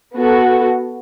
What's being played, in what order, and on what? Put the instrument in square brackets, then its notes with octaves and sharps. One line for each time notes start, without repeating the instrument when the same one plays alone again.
[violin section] B3 F#4 A4